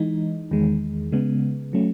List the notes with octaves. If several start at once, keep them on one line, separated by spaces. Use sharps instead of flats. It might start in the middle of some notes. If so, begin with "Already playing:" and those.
Already playing: E3 G#3 D#4
E2 D#3 G#3
C#3 G#3 B3
F#3 A3 C#4